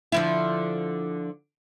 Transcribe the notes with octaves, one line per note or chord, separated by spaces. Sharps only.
D3 F3 E4